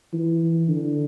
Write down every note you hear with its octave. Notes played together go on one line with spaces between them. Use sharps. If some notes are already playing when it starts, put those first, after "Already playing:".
E3
D3